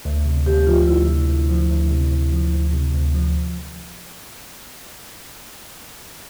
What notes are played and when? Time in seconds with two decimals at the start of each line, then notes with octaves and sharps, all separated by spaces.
0.05 D2
0.26 C3
0.46 D2 G4
0.67 F3 F4
0.81 F4
0.87 D2 E4
1.08 C3
1.29 D2
1.49 F3
1.70 D2
1.91 C3
2.12 D2
2.32 F3
2.53 D2
2.73 C3
2.94 D2
3.14 F3